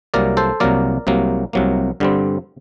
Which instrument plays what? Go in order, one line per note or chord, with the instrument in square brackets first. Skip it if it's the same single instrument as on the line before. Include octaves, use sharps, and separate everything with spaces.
[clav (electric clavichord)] C2 C3 F#3 A#3 A#4 D5
A4 C5
C2 C3 F#3 A#3 A#4 D5
C2 C3 F#3 A#3
C2 C3 F#3 A#3
G2 D3 G3 C4